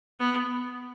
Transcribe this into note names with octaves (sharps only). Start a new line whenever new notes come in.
B3